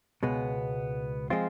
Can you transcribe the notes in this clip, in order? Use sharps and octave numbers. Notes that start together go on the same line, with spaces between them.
C#2 B2 G#3 B3
F3 G#3 C4 F4